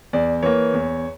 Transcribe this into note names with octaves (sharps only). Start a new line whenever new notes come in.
E2 D5
E3 A#3 C#5
E2